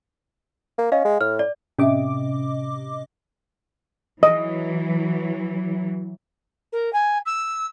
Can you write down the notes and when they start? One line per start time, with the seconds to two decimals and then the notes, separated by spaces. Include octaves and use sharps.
0.79 A#3
0.92 C#4 D#5 F5
1.05 G#3
1.21 A2 F6
1.39 D5
1.79 A2 C3 C#4 D#5 E5 D6
4.23 E3 F#3 D#5
6.73 A#4
6.93 G#5
7.26 E6